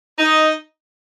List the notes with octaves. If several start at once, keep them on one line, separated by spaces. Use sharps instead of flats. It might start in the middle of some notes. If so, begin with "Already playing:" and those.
D#4